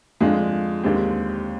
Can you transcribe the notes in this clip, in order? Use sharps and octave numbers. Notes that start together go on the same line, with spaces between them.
F2 D3 G#3 D4 F4
D#2 D3 G#3 C4 G4